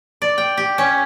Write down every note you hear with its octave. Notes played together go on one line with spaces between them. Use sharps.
D5
G5
G4
C#4